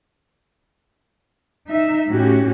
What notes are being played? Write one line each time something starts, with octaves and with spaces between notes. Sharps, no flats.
D#4 E5
A2 C#4 F#4 G4